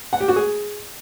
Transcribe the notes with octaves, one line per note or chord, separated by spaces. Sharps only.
F#5
G4
F#4
G#4